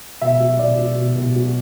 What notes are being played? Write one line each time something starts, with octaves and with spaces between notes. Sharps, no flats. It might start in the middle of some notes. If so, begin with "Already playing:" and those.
B2 E5
F#3
B2 D5
F#3
B2
B2
F#3